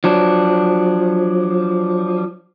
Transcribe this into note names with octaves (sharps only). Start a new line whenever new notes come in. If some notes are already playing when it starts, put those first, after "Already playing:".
F3 F#3 D4